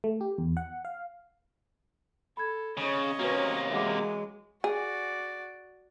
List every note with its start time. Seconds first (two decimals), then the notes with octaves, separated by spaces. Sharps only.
0.04 A3
0.21 G4
0.38 E2
0.57 F#5
0.85 F5
2.37 A4 B5 G#6
2.77 C#3 C#5 D#5
3.19 C3 A#3 C#4 F#4 B4
3.71 E3 F#3 G#3 E5 F#5 D6
4.64 F#4 G#4 D5